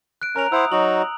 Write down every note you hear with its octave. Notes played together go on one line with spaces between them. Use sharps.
F#6 D7
C#4 A#4 A#5 F7
E4 C5 F#5 D#6 E6
F#3 D#4 F#4 F#7